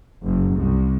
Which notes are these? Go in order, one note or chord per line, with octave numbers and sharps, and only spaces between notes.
F#1
C2